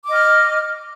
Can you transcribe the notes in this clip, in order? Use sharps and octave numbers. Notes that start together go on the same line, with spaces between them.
D#5 D6 F6